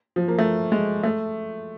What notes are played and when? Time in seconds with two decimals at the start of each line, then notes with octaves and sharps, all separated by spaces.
0.16 F3
0.28 A#3
0.39 A3
0.72 G#3
1.04 A3